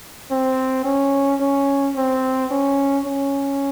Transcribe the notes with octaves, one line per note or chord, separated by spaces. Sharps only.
C4
C#4
C#4
C4
C#4
C#4